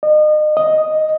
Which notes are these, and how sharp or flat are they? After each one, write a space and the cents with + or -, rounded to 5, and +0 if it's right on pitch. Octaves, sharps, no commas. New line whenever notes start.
D#5 -35
D#5 +0